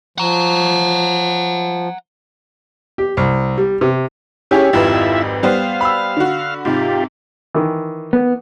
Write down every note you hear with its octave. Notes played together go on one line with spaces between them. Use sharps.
F3 F#5 A#5
G4
C2
G3
C3
C#4 E4 G4 G#4 C#5
G#1 F2 E4 F4 B4 E5
G3 B3 C5 F5
B5 E6
D3 F#4
G#2 C3 F4 G4
D#3 E3
B3